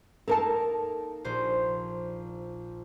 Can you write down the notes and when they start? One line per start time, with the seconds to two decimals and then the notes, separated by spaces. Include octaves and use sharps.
0.28 A#3 D#4 A4 A#4 A5
1.25 A#1 C5